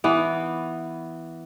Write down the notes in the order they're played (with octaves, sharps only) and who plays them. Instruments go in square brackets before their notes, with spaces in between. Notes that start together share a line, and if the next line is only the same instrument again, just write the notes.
[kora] E3 B3